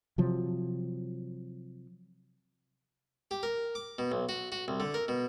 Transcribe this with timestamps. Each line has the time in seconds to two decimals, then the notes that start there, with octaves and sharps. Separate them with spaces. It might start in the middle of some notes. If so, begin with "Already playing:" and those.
0.18 C3 F3 F#3
3.31 G4
3.43 A#4
3.75 D6
3.98 B2
4.12 B1
4.29 F#4
4.52 F#4
4.68 C2
4.80 D3
4.94 A#4
5.08 B2